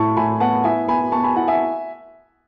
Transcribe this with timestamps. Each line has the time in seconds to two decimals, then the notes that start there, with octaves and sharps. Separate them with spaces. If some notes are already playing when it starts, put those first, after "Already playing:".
Already playing: A2 E4 A5 C#6
0.17 A2 G#5 B5
0.40 B3 F#5 A5
0.64 E4 E5 G#5
0.88 B3 G#5 B5
1.12 B3 A5 C#6
1.24 G#5 B5
1.36 E4 F#5 A5
1.48 E5 G#5